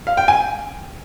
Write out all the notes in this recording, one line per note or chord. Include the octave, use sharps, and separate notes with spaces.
F5
G5
G#5